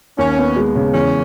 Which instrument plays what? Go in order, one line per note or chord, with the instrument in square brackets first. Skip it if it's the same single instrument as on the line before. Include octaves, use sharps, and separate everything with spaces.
[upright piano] D#2 [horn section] C#4
[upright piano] B3
G#3
C#3
[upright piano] E2 [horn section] C#4